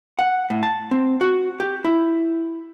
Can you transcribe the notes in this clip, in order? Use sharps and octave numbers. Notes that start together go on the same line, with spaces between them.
F#5
A2
A5
C4
F#4
G4
E4